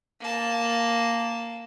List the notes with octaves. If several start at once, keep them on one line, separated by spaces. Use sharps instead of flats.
A#3 A5